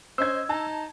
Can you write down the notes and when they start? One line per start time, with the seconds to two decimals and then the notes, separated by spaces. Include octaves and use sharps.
0.18 C#4 C5 D#5 E6 G#6
0.49 D#4 A5